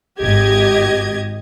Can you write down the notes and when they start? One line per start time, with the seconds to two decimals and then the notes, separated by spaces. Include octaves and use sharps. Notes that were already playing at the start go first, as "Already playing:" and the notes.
0.21 G#1 G4 D#5 G#6